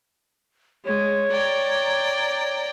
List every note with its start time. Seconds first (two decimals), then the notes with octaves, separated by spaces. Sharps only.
0.86 G#3 C#5
1.31 D5 G5 A#5